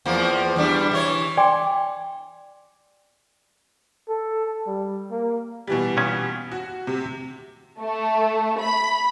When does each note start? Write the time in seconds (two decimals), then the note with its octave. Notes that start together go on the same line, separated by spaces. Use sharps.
0.06 E2 F3 A#3
0.56 E2 G3 D4
0.91 E3 E4 C#5
1.37 D5 G5 G#5 C6 D6
4.09 A4
4.67 G3
5.11 A#3
5.67 B2 E3 G3
5.97 A#2 D#3 C#4
6.52 F#4
6.87 C3
7.80 A3
8.59 B5